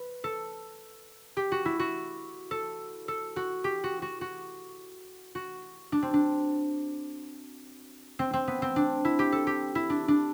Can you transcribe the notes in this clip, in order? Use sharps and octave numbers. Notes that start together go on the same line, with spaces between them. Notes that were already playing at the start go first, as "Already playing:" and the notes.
Already playing: B4
A4
G4
F#4
E4
F#4
A4
A4
F#4
G4
F#4
F#4
F#4
F#4
D4
C4
D4
C4
C4
B3
C4
D4
E4
G4
A4
G4
E4
D4
D4